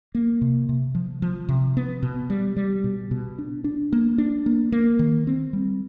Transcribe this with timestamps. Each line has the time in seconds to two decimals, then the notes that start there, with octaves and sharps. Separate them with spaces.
0.15 A#3
0.41 C3
0.69 C3
0.95 F3
1.22 F3
1.49 C3
1.77 B3
2.03 B2
2.30 G3
2.56 G3
2.84 B2
3.11 B2
3.39 D4
3.64 D4
3.93 A#3
4.18 D4
4.46 A#3
4.72 A#3
4.99 D#3
5.27 C4
5.53 G3